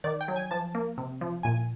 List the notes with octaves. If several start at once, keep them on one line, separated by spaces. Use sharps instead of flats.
D#3 D5
G5
F#3
G#5
F3 A5
A#3
C3
F3
A#2 G#5